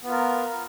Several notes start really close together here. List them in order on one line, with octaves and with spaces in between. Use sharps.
B3 F4 A#4